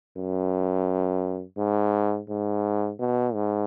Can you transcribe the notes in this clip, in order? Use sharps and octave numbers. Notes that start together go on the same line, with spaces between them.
F#2
G#2
G#2
B2
G#2